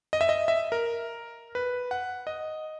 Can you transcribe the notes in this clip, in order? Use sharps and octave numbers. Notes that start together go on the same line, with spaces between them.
D#5
E5
D#5
E5
A#4
B4
F#5
D#5